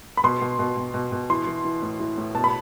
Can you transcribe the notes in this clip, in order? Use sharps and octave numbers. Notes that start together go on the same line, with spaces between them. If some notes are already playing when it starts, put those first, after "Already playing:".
B5
B2 C6
B2
B2
B2
B2
B2
E3 C6
E3
E3
A2
E3
A2
B2 A5
B5